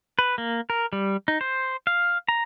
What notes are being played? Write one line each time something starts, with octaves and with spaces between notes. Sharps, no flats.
B4
A#3
A#4
G3
D#4
C5
F5
A#5